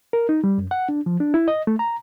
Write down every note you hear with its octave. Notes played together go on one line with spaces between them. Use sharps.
A#4
D#4
G3
F#2
F#5
D4
F3
D4
E4
D#5
A3
A#5